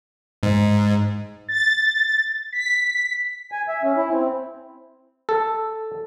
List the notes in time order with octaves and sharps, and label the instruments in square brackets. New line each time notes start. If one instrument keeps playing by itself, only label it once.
[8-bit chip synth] G#2
[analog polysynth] A6
B6
[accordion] G#5
E5
C#4
E4
C4
[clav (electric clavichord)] A4